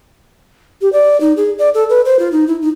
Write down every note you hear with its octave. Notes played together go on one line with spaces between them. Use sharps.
G4
D5
D#4
G#4
D5
A4
B4
C5
F4
D#4
E4
D#4